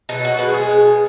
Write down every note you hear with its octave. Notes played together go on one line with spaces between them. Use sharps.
B2 F#3 D#4
F#4
B2 G#3 B4
G#4
B2 G#3